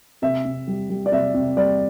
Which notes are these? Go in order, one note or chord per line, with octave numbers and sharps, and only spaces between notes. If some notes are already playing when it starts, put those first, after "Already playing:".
C3 E5
C3
G3
G3
D5
C3 E5
C3
G3 D5